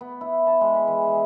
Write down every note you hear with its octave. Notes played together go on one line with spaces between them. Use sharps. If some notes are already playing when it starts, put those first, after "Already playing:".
B3
E4
A5
G#3
B5
E3
G#5